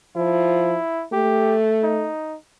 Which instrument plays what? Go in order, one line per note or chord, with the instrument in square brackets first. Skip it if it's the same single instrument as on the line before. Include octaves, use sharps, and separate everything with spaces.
[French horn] F3 [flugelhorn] E4
[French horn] A3 [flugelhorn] G4
[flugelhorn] D#4